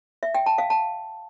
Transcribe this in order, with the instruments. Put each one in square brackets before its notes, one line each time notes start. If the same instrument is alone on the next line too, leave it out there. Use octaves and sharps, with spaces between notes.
[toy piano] E5
G5
A5
F5
A5